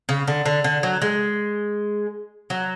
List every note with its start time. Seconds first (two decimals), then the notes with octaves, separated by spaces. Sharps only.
0.09 C#3
0.28 D3
0.46 D3
0.64 D3
0.83 F#3
1.02 G#3
2.50 F#3